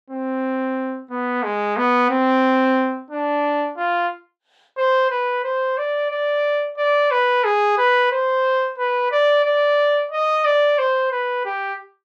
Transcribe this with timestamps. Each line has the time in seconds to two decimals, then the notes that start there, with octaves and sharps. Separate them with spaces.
0.10 C4
1.10 B3
1.43 G#3
1.77 B3
2.10 C4
3.11 D4
3.77 F4
4.77 C5
5.11 B4
5.44 C5
5.78 D5
6.11 D5
6.78 D5
7.11 B4
7.44 G#4
7.78 B4
8.12 C5
8.78 B4
9.12 D5
9.45 D5
10.12 D#5
10.45 D5
10.78 C5
11.12 B4
11.45 G4